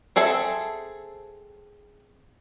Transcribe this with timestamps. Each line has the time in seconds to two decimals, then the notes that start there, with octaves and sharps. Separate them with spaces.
0.16 C4 G#4 A4 E5